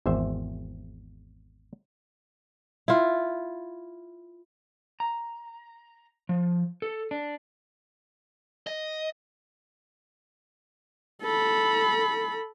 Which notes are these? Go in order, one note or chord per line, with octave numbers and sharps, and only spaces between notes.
G#1 E2 C5 E5
E4 F4
A#5
F3
A4
D4
D#5
A4 B5